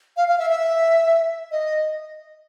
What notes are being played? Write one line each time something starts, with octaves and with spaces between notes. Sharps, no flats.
F5
F5
E5
E5
D#5